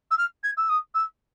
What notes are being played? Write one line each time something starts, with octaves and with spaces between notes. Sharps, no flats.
E6
F6
G#6
E6
D#6
E6